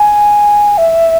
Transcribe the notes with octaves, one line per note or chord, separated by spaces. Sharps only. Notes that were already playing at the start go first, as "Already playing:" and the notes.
Already playing: G#5
E5